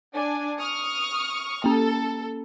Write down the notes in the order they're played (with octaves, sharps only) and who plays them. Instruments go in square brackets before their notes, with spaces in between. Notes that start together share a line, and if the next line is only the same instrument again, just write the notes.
[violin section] D4 G#5
C#6 D#6 F6
[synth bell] A#3 C#4 [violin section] A4